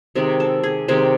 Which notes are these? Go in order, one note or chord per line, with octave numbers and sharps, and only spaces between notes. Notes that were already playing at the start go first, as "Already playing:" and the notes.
C3 D#3 G#3
A4
G#4
C3 D#3 G#3 C5